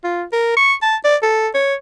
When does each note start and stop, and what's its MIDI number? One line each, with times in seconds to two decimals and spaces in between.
0.04 0.23 65
0.33 0.53 70
0.57 0.74 85
0.82 0.96 81
1.04 1.16 74
1.23 1.48 69
1.54 1.75 73